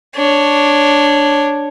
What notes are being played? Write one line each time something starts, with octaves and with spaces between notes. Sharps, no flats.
D4 C#5